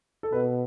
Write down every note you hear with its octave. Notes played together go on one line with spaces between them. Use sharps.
A4
B2 B4